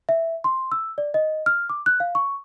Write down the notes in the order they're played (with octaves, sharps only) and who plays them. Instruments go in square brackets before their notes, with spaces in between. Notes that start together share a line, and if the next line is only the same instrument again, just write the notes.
[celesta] E5
C6
E6
D5
D#5
F6
D6
F#6
F5
C#6